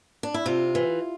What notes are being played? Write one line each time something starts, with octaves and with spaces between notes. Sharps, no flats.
D4
E4
C3 F4
E3